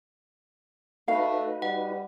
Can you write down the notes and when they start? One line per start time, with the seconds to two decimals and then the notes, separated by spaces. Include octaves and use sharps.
1.08 A3 D#4 F#4 B4 F5
1.62 G3 F#5